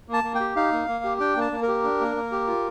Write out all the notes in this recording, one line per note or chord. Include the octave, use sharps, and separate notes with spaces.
A#3
A5
A#3
G5
G4
D#4 F5
A#3
A#3
G4
D4 G5
A#3 A5
A#3
A#4
G4
D4
A#3
A#3
G4
F4